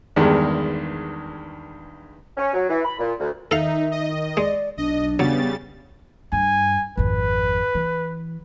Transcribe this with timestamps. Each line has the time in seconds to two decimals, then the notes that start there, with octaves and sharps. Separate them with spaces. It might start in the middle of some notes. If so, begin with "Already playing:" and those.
0.16 E2 G2 D#3 G#3
2.37 C#4
2.54 F#3
2.70 E3
2.85 B5
2.99 A#2
3.19 D2
3.51 D#3 D#4 A4 E5 F5
3.92 D#5
4.37 G#3 D5
4.78 B1 D4 D#5
5.19 C#3 F#3 G3 B3 A6
6.32 G2 G#5
6.97 G#1 F2 B4
7.75 E3